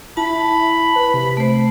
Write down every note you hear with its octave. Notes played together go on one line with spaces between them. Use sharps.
E4 A5 B5
B4
C3
A3 C5